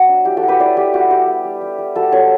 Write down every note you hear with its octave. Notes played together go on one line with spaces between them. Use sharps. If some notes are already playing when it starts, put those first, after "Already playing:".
Already playing: F#3 B3 F#4
D4
E4 G4
F#4 A4
E4
G4 B4
E4 B4 D5
A3 G4
G3 F#4
G3 G4
B3
G3
G3
G3
G3 F#4 A4
G3 A4 C#5